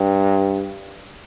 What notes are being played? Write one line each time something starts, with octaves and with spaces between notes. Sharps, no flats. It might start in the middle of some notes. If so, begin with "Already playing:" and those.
Already playing: G2